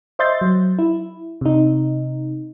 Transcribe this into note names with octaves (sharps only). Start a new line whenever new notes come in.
C5 D#5 E5 C6 G6 A6
F#3
E4
C3 D#4